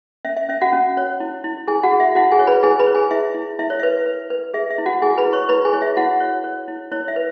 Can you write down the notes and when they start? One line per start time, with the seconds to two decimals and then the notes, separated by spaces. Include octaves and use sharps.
0.25 C#4 E5
0.36 E5
0.49 C#4 E5
0.61 F#4 F#5
0.73 C#4
0.97 C#5
1.20 E4
1.44 E4
1.68 E4 G#4 G#5
1.83 F#4 F#5
1.92 G#4
2.00 E5
2.15 E4 F#4 F#5
2.32 G#4 G#5
2.39 C#5
2.47 B4 B5
2.63 E4 G#4 G#5
2.79 B4 B5
2.87 C#5
2.95 G#4 G#5
3.11 E4 E5
3.34 E4
3.59 E4 E5
3.70 C#5
3.80 B4 E5
4.06 B4
4.30 B4
4.54 G#4 E5
4.71 E5
4.78 E4
4.86 F#4 F#5
5.01 E4 G#4 G#5
5.18 B4 B5
5.25 E4
5.33 C#5 C#6
5.49 E4 B4 B5
5.65 G#4 G#5
5.73 E4 C#5
5.82 E5
5.97 E4 F#4 F#5
6.20 C#5
6.44 C#5
6.68 E4
6.92 E4 C#5
7.08 E5
7.16 B4